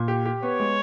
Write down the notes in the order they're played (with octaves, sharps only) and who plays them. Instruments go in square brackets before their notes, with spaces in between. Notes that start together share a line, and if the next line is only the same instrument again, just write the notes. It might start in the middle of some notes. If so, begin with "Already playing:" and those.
Already playing: [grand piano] A#2
G4
G4
[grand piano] B3 [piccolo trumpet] C#5
[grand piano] G#3